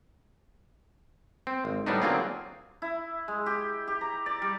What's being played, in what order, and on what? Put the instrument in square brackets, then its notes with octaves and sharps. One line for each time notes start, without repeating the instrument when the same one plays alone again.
[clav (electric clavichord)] C4
G#1
A2 G3 B3 D4 D#4
D3 F#3 A#3 C4 F4 G#4
[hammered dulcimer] E4
G#3
G4
G4
A#5
D5
G3